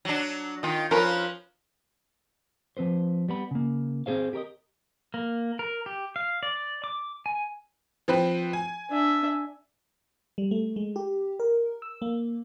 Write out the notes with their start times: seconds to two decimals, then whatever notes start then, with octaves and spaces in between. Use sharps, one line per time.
0.05 F#3 D4
0.63 D#3 F4 D#5 G5
0.91 F3 C#4 F4 A#4 B4 B5
2.77 F3 C4 B4 C5
3.28 G3 B3 B5
3.51 C#3 A#3
4.06 C4 D4 G#4 C5 F5
4.33 G4 A#4 C#5 D#5
5.14 A#3
5.59 A#4
5.86 G4
6.16 F5
6.43 D5
6.84 D6
7.26 G#5
8.08 F3 C4 B4
8.53 G#5
8.90 D4 E5
10.38 G3
10.51 A3
10.76 G#3
10.96 G4
11.40 A#4
11.82 E6
12.02 A#3